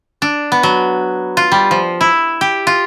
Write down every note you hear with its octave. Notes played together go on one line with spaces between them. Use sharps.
D4
B3
F#3
F4
G3
F3
E4
G4
F4